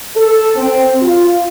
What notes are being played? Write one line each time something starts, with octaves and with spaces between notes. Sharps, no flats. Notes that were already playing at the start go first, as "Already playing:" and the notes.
A4
C4
F4